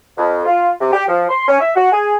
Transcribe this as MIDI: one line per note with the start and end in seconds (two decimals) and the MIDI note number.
0.17 0.42 41
0.45 0.70 65
0.81 0.93 48
0.93 1.03 67
1.08 1.26 53
1.29 1.47 84
1.48 1.58 61
1.60 1.71 76
1.76 1.92 66
1.92 2.16 68